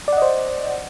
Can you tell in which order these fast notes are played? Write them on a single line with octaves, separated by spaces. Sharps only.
D5 F#5 D#5 C5